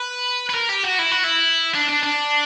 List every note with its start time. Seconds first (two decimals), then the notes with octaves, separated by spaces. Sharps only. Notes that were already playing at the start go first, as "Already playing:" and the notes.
Already playing: B4
0.49 B4
0.54 A#4
0.69 G4
0.84 F#4
0.99 E4
1.11 F#4
1.24 E4
1.74 D4
1.89 D4
2.03 D4